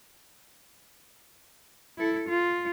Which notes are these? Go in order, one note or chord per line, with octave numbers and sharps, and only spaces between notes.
E4 A4
F4